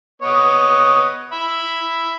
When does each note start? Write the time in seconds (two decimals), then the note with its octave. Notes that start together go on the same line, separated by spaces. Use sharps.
0.22 B3 C#5 D#5
1.32 E5 B5